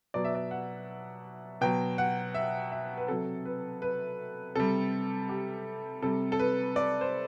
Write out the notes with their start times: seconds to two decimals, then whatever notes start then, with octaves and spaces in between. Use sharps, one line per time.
0.14 B2 F#3 D5
0.24 E5
0.35 D5
0.51 F#5
1.61 B2 F#3 G5
1.98 F#5
2.34 E5
2.72 E5
2.98 B4
3.08 C3 F#3 A4
3.45 B4
3.82 B4
4.55 C3 G3 A4
5.29 G4
6.02 C3 G3 A4
6.32 A4
6.39 B4
6.76 D5
7.01 C5